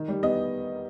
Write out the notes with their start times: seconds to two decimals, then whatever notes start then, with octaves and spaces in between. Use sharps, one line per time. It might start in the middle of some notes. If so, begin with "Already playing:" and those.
Already playing: D#3
0.08 G3
0.23 B3 D#5